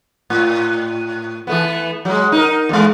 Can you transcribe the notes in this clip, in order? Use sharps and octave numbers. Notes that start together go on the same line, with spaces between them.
A2
E3 A3 B3
F#3 G#3
D#4 A#4
E2 G#3